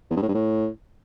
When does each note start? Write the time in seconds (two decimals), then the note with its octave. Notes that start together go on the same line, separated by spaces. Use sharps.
0.10 E2
0.16 G2
0.22 A2
0.28 G2
0.35 A2